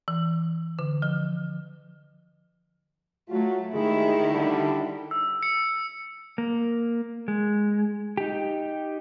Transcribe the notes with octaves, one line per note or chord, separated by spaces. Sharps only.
E3
D3
F3
F#3 A3 F4 F#4
D#2 D#3 G#3 E4 G#4
D3 G3
E6
C#7
A#3
G#3
D#4 G4